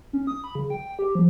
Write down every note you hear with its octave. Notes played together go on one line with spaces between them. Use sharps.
C#4
D#6
B5
C#3
G5
G5
G4
F3